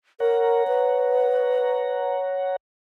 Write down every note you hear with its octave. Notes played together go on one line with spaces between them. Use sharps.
A#4 C#5 F#5 A#5
B4